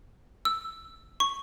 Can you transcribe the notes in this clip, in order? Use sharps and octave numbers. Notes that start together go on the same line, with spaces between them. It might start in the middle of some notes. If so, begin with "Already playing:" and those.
E6
C#6